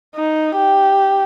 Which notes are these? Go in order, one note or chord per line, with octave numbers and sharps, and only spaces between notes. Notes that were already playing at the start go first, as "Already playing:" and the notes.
D#4
G4